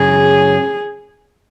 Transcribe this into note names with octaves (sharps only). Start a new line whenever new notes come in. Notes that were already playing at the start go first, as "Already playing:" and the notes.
Already playing: F#2 C#3 F#3 G#4